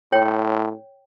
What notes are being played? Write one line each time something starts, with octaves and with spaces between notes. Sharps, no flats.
A2 C#5 G5